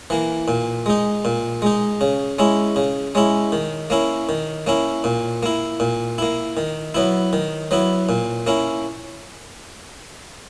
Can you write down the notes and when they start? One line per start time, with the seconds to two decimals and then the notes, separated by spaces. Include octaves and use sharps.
0.10 E3 A#3
0.48 A#2
0.86 G#3 D#4
1.25 A#2
1.62 G#3 D#4
2.01 C#3
2.39 G#3 C#4 E4
2.76 C#3
3.15 G#3 C#4 E4
3.52 D#3
3.90 A#3 C#4 E4
4.29 D#3
4.66 A#3 C#4 E4
5.04 A#2
5.43 A#3 E4
5.80 A#2
6.18 A#3 E4
6.57 D#3
6.94 F#3 B3 E4
7.33 D#3
7.71 F#3 B3 E4
8.09 A#2
8.46 A#3 C#4 E4